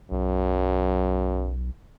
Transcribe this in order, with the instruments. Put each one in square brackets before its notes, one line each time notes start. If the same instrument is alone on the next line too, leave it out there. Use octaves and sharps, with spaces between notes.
[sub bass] B1 [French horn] F#2